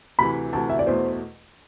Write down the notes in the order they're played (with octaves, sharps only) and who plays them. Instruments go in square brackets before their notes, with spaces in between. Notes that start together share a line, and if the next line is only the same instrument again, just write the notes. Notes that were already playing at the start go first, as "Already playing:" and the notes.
[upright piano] D2 C3 E3 [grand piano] B5
[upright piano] D2 C3 E3 [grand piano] A5
[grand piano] E5
D5
[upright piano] E2 B2 A3 E4 [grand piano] C5